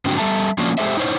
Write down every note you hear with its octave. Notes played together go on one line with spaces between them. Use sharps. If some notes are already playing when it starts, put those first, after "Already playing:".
G#2 D3 C4 D4 F#4 G4
G3 A4 E5 A5 A#5
F3 A#3 C#4 D4 F4 F#4
G#3 G4 A4 C5 E5
D#4 E4 C5 C#5